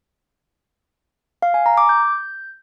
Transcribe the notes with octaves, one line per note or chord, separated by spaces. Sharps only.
F5
G#5
A#5
D6
G6